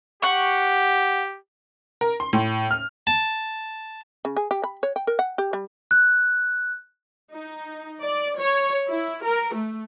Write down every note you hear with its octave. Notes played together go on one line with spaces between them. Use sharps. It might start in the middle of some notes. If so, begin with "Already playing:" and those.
G4 F#5 C#6
A#4
C6
A2
F6
A5
C#3
G#4
G4
B5
C#5
G5
A#4
F#5
G4
G3
F#6
D#4
D5
C#5
E4
A#4
A3